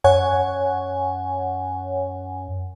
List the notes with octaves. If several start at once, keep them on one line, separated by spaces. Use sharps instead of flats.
F#2 C#5 F#5 G#5